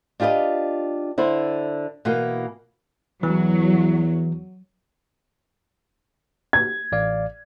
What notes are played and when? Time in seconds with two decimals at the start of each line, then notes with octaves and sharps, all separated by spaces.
0.20 D4 F4 G4 B4 D#5
1.18 D3 E4 C5
2.05 B2 E3 A#3 B3
3.23 E2 E3 F#3
6.53 G#6
6.92 A1 D5 F5